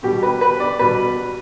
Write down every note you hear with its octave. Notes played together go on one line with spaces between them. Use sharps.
B2 G3 G4
B4
B4
D5
B2 G3 B4